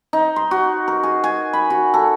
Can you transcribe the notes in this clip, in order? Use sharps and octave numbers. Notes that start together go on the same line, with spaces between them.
D#4
C6
F#4
A#4
G#4
G#5
B5
F#4
A4